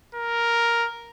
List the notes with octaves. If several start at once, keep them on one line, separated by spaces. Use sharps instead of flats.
A#4